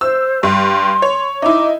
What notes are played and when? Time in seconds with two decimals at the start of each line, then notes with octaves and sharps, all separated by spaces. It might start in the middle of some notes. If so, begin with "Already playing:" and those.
0.01 C5 E6
0.43 G2 C6
1.02 C#5
1.42 D#4 E4 D6